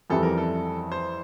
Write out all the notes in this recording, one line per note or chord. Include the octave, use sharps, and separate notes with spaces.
F2 E3 G3 C4 E4 A4
A#4
A4
C5